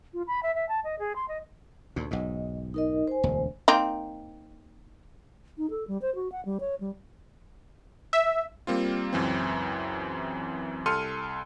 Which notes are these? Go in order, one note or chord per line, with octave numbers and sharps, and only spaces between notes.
F4
B5
E5
E5
A5
D#5
G#4
C6
D#5
D2 A#2
B1 G#2 D#5
D#4 A#4 D#5
C5 G#5
E1 D2
A#3 C4 D#4
D#4
A4
G3
C5
F#4
F#5
G3
C#5
G3
E5
G3 A#3 C4 F4
C#2 F#2 E3 C4
C2 A4 C6 F6 C#7 D#7